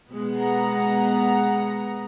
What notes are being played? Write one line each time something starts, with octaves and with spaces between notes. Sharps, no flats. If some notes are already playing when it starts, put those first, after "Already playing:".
B2 G#3 B3
F#5 A#5